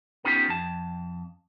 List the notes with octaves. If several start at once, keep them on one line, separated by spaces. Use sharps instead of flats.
B3 C#4 D#4 F4 G4
F2 A5